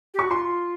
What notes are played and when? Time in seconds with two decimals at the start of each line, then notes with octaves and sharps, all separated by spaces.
0.14 G4
0.19 F#4 C#6
0.31 F4 C6